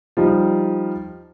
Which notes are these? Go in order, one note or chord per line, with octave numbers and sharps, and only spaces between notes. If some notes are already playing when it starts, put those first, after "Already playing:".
F3 G3 D#4